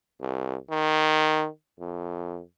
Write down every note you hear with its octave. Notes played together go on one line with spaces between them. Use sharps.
C2
D#3
F2